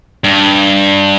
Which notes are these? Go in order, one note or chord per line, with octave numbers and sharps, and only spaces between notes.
G2